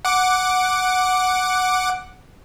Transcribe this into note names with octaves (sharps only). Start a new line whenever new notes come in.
F#5 D6